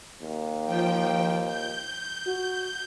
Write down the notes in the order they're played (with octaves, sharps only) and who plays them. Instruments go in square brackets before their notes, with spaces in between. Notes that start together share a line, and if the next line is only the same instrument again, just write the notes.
[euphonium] D#2
[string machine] F3 G5
G6
[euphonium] F#4